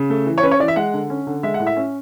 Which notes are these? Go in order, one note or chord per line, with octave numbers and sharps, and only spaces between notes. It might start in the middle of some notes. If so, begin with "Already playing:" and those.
Already playing: C#3
A3
E3
C#5
C#4 B4
C#5
E3 D5
E5
G#3 F#5
D3
C#4
D3
G#3 E5
F#5
A2
E5
C#4